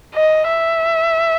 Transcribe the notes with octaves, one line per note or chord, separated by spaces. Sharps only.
D#5
E5